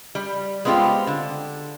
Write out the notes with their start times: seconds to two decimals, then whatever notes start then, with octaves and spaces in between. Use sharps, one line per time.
0.15 G3
0.65 G#3 B3 C4 F4 G4
1.07 D3